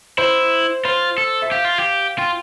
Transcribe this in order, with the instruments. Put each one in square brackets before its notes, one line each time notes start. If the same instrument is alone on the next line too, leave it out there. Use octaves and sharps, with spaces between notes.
[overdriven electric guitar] E4 [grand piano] C5
[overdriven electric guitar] F4 [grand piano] C5
[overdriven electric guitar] A4
[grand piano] E5
[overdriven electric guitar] G4 [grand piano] F5
[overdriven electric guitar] F4
G4
[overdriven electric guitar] F4 [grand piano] G5